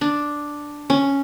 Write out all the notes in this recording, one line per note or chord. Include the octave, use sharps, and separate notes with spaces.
D4
C#4